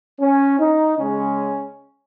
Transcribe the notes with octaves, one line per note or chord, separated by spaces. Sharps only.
C#4
D#4
C#3 G#3 C#4